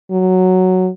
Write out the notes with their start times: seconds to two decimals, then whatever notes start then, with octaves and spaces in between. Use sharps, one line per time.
0.11 F#3